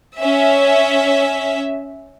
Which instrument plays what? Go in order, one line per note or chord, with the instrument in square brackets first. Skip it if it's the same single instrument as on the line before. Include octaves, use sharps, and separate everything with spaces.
[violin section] C#4 E5